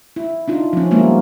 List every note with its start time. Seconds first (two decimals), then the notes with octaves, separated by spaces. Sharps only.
0.16 E4
0.48 D4 D#4 F4
0.73 F3 C#4
0.91 G3 G#3 A#3 B3 E4 F4